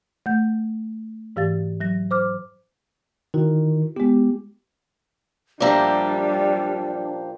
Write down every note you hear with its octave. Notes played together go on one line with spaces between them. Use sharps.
A3 F#5 G6
G#2 E3 G4 F5 A6
F#3 A#6
C5 D6 F6
D#3 E4 F#4
G#3 B3 G4
A#2 F3 G3 D4 G4 D5 E5 A#5